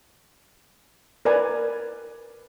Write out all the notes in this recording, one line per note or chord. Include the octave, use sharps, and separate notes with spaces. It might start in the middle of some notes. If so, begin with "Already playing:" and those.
A#4 B4 D5 G#5